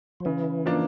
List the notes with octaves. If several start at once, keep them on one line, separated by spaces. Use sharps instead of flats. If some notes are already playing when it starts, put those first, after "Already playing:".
F3
C#3 E3
F3 A#3 D4